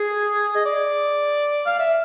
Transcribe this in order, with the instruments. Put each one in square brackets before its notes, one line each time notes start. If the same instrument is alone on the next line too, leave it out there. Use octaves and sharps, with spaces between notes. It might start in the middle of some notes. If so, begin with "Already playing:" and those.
Already playing: [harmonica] G#4
D#5
D5
F5
E5